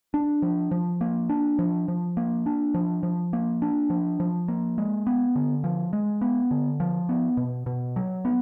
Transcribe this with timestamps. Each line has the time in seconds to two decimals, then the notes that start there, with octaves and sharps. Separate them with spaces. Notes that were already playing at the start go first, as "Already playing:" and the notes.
0.14 D4
0.42 F3
0.71 F3
1.01 A#3
1.30 D4
1.59 F3
1.88 F3
2.17 A#3
2.46 D4
2.74 F3
3.03 F3
3.33 A#3
3.62 D4
3.90 F3
4.20 F3
4.48 A#3
4.78 G#3
5.07 B3
5.36 D3
5.64 F3
5.93 G#3
6.21 B3
6.51 D3
6.80 F3
7.09 B3
7.37 B2
7.66 B2
7.96 F#3
8.25 B3